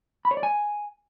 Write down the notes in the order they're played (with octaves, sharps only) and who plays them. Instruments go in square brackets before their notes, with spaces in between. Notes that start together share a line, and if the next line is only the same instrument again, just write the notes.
[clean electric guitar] B5
C#5
D5
G#5